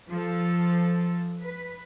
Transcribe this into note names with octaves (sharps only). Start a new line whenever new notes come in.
F3 A4
B4